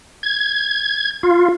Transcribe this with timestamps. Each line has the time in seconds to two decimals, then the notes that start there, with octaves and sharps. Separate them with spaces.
0.23 G#6
1.23 F4